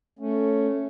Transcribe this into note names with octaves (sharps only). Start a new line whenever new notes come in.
A3 C#4